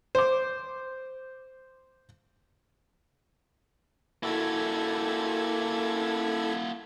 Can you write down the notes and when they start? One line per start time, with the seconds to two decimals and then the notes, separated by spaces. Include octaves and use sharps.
0.15 C5 D6
4.23 A#3 E4 F#4 A4 G#6